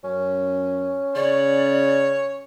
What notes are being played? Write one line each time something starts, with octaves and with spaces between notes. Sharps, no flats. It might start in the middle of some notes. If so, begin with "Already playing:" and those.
F#2 C#4
C#3 C#5 D5